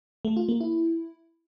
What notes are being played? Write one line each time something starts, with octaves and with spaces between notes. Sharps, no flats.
A3
F4
A#3
E4